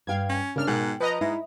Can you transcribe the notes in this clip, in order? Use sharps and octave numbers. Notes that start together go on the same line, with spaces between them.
G2 F5 G5 G#6
C#4
C#3 D4 A#4 F6
G#2 B2 A#4 G5 F#6
F3 B4 D#5 A#5
G#2 E4